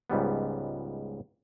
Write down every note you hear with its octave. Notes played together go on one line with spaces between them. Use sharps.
C#2 G#2 G3 B3